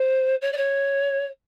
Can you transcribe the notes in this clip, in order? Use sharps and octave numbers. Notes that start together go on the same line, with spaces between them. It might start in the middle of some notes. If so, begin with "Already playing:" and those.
Already playing: C5
C#5
D5
C#5